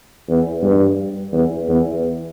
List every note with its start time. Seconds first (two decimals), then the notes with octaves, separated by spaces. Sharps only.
0.29 E2
0.63 G2
1.32 E2
1.68 E2